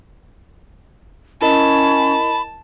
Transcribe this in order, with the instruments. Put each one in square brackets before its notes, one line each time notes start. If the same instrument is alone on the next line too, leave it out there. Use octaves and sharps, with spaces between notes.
[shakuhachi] C#4 [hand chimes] E4 A#4 D#5 [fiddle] A5 [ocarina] B5